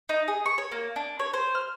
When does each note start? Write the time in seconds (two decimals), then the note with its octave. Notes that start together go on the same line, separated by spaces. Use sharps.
0.09 D#4
0.28 G#4
0.46 C#6
0.58 C#5
0.72 A#3
0.96 D4
1.20 C#5
1.34 C5
1.55 F6